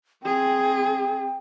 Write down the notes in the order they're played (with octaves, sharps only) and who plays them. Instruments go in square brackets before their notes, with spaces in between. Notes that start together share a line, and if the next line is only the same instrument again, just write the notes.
[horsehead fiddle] C4 G#4 [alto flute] G5